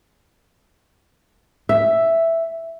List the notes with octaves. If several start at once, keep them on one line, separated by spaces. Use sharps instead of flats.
E5